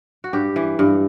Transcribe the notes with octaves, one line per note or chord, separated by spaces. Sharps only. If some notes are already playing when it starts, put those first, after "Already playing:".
F#4
G2 G4
E3
G2